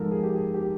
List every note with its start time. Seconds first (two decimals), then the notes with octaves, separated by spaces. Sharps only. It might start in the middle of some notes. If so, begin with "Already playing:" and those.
Already playing: G#2 F3 A4 A#4
0.11 G#4
0.23 G4
0.35 G#4
0.54 G4